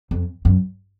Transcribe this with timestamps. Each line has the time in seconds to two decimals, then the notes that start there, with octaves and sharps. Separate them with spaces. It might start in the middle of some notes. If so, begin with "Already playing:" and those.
0.11 F2
0.45 F#2